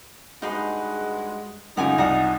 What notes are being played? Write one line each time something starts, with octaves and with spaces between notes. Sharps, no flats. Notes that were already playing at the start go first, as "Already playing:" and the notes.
G2 G#3 D#4 F#4 G#4 B4
F#2 C#3 F3 D#4 F#5 G#5 D6
C2 F#5 G#5 A#5